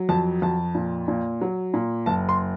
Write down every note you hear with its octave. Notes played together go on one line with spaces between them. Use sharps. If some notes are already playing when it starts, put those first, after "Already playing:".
Already playing: F#3
F2 A5
F2 A5
A#2
A#2
F#3
A#2
F#1 A5
C6